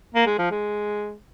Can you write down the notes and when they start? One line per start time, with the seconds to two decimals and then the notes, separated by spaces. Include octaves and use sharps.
0.15 A#3
0.27 G#3
0.39 F3
0.51 G#3